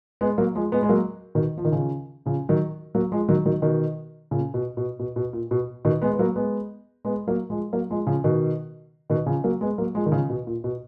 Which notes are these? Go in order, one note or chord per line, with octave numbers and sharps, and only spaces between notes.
G#3 B3
F#3 A#3
F3 G#3
G#3 B3
G#3
F#3 A#3
B2 D#3
F3
D#3
C#3 F3
C#3 F3
D#3 F#3
F#3 A#3
F3 G#3
D#3 F#3
D#3 F#3
B2 D#3
A#2 C#3
B2
B2
B2
B2
A#2
B2
B2 D#3
G#3 B3
B3
F#3 A#3
G#3 B3
G#3 B3
F#3 A#3
F3 G#3
F#3 A#3
F3 G#3
C#3 F3
B2 D#3
B2 D#3
C#3 F3
F#3 A#3
G#3 B3
F#3 A#3
F3 G#3
D#3
C#3 F3
B2
A#2
B2